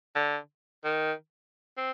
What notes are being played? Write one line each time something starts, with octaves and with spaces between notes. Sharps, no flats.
D3
D#3
C4